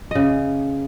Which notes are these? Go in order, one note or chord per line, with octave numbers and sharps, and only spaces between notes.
C#3 D#5